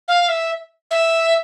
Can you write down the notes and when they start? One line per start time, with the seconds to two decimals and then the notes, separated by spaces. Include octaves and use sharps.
0.08 F5
0.29 E5
0.91 E5